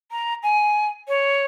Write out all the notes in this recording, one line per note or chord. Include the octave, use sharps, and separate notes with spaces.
A#5
G#5
C#5